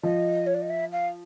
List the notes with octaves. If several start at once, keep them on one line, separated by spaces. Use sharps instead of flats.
F3 D#5
C#5
D5
D#5
E5
F5